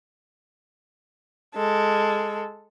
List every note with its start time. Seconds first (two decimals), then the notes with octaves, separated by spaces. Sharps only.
1.55 G#3 A4